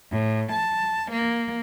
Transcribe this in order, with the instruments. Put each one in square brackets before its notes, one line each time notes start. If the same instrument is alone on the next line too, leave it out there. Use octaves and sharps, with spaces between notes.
[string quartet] A2
A5
A#3